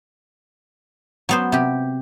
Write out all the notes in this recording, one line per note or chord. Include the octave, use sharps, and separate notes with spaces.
F#3 B3 C5
C3 G4